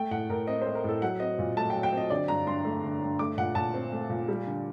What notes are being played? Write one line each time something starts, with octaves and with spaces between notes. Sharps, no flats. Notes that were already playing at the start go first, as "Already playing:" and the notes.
Already playing: A3 G5
A2 F#5
A2 A#4
C4 D#5
A3 C5
A#4
A2 A4
F#3 F#5
C4 D#5
A#2
A3 A5
G5
F#3
G5
C4
D#5
D3 D5
G2 A#5
G2 C6
A3
D3
G2
A3 D6
A#2 F#5
A#2 A5
C4
A3
A#2
G3
D3